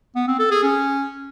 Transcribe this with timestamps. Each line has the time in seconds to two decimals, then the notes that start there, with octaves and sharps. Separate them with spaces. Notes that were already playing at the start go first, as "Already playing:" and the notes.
0.16 B3
0.27 C4
0.39 A4
0.51 G#4
0.63 C#4